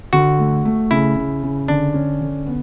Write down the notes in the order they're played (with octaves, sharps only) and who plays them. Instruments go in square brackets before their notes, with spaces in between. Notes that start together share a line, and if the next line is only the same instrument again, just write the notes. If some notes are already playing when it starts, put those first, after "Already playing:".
[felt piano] D3 [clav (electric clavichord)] F#4
[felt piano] A3
A3
[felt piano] C#3 [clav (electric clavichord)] E4
[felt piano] C#3
C#3
[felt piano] D3 [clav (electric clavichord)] D4
[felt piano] C#4
D3
B3